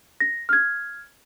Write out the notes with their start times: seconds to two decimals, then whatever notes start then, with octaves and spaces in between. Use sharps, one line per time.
0.20 A#6
0.49 F6 G#6